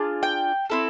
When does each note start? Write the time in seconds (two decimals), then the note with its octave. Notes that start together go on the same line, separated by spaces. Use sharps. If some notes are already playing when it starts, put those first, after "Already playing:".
Already playing: D4 F4 G#4
0.23 G5
0.70 C4 E4 A4